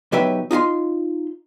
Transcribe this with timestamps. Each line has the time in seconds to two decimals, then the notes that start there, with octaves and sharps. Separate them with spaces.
0.12 B1 F#3 G4 B4 E5
0.51 D#4 F4 A#5 C6